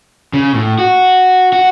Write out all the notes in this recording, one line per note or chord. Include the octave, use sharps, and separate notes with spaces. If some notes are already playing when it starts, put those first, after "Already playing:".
C#3
A2
F#4
F#4